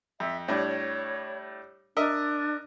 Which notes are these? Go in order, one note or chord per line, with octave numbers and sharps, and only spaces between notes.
F2 E5
A2 G3 D4 C#5
D4 A#4 D#5 E5